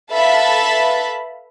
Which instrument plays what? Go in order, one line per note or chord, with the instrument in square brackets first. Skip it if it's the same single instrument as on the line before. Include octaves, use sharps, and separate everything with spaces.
[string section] A4 B4 E5 F5 A5 B5